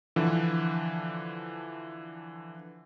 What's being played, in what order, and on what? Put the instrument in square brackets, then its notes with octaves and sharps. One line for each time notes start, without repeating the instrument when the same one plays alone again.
[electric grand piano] D3 E3 F3